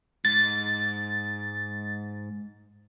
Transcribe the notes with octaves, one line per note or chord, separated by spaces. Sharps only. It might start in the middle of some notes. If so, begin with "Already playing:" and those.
G#2 A6